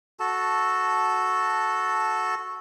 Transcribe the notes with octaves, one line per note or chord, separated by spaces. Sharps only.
F#4 A4 A5